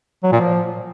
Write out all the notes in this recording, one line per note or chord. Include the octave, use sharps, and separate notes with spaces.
F#3
A#2
F3